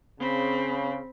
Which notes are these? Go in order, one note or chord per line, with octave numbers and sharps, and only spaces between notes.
C#3 C4 B5